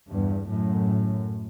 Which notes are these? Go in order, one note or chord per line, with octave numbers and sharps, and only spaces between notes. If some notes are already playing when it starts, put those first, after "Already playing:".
E2 G2
F#2 A2